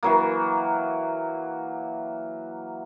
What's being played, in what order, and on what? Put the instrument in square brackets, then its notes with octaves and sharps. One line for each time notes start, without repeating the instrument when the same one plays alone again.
[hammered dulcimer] E3 F#3 A#3